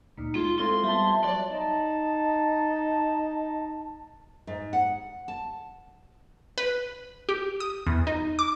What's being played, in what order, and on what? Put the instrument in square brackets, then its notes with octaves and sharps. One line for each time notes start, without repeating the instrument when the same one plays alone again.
[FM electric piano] D2 A#2 [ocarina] D#4
[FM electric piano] G#3 [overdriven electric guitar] F4
[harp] C4 E4 F4 [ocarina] A4 [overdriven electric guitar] C6
[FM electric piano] G3 [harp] B3 A5 [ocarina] E5
[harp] E4
[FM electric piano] F#3 C#5 [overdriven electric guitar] D5
[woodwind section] D#4 A5
[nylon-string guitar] G#2
F#5
A5
[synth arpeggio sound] B4
G4
D#6
E2
D#4
D6